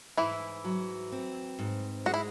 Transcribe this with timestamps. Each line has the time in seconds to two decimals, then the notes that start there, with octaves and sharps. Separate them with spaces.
0.18 G#2 E3 E4
0.64 F#3
1.12 C4
1.59 G#2
2.06 G#3 F#4
2.14 E4